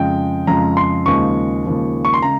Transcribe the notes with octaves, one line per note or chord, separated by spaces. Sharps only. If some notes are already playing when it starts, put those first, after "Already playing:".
Already playing: F2 C#3 G#3 G5
F2 C#3 G#3 A#5
C6
D#2 C#3 F3 G#3 C#6
D#2 C#3 F3 G#3
C#6
C6
C#3 G#3 A#5